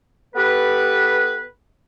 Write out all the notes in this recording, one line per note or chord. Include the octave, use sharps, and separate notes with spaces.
B3 G4 A4 B4